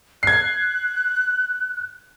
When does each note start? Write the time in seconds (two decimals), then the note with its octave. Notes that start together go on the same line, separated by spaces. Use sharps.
0.23 F#6 G#6 C7